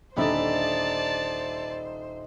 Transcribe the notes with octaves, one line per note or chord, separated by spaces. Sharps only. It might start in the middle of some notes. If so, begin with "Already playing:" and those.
D#1 D3 D#4 C5 D5 E5 A5 B5